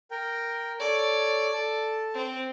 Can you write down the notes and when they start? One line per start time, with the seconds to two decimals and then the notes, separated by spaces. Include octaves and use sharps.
0.11 A#4 G5
0.80 A4 C#5 D5
1.54 A4 A5
2.15 C4